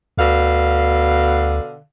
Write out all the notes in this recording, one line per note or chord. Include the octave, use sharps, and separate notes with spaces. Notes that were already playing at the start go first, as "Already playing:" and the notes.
D2 B2 D3 F5